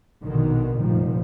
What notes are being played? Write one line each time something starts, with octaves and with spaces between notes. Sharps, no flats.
A#1 B2 D3 D#3
F1 A#2 D#3 F3 G3